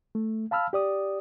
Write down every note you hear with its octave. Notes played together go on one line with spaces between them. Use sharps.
A3
F5 A5 B5 E6 F6
G4 D5 D#6